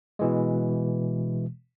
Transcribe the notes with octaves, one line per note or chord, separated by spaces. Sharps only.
B2 E3 G#3